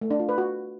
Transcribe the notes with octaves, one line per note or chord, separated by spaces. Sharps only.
A3
D4
F4
B4
F#4